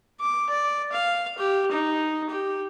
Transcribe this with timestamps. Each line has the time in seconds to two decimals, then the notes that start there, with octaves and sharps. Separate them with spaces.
0.21 D6
0.50 D5
0.92 F5
1.38 G4
1.71 D#4
2.30 G4